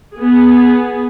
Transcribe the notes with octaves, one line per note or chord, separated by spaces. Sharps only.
B3 G#4